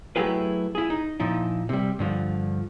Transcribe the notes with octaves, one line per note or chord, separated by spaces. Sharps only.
F#3 A3 E4 G4 G#4 B4
E4 G#4
D#4
A#2 F3 D#4 E4
C3 G3
G2 D3 F3